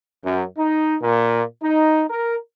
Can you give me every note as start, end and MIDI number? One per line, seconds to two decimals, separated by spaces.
0.25 0.45 42
0.58 0.96 63
1.02 1.43 46
1.63 2.04 63
2.10 2.37 70